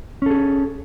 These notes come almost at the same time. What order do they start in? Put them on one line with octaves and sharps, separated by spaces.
C#4 A4 G#4